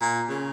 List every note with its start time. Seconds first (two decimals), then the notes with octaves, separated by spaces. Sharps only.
0.02 A#2
0.29 C#3